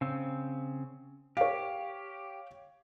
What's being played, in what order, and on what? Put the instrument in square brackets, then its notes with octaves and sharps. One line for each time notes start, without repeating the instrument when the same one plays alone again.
[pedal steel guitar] C#3 C4
[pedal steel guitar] G4 [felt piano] C#5 F5